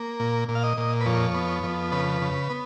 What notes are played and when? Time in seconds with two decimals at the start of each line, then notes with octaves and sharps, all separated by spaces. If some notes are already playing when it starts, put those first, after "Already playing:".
Already playing: A#3
0.20 A#2
0.49 A#2
0.55 F5
0.63 D#5
0.77 A#2
1.01 B4
1.06 F2 C#5
1.34 B3
1.63 F2
1.92 C#3 B4
2.21 C#3
2.50 B3